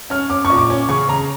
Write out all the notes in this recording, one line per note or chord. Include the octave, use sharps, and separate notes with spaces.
C#4 F6
C#4 D6
C#6
A#2
D6
C#4
C#3 C#6
C#3 A#5